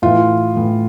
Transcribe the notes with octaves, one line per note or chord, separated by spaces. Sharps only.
A2 E3 F4
A2 E3